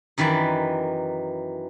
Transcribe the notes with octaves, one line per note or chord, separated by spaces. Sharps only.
F#2 D#3 E3 B4 D5